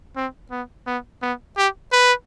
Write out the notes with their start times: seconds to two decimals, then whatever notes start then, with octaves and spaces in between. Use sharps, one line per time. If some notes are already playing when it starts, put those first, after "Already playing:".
0.16 C4
0.51 B3
0.87 B3
1.22 B3
1.57 G4
1.92 B4